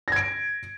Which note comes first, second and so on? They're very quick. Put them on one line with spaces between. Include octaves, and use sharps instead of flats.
A#6 G#6 D7